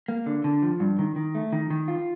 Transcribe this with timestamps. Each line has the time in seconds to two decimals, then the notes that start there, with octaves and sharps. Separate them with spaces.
0.08 A#3
0.26 D3
0.44 D3
0.62 F3
0.80 G2
0.99 D#3
1.16 D#3
1.35 A3
1.53 D#3
1.70 D#3
1.88 F4